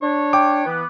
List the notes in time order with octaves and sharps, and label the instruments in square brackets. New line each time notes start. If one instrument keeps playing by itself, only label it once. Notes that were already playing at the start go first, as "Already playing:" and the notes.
[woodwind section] D4 C#5
[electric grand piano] G5 D6
[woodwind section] E3 B3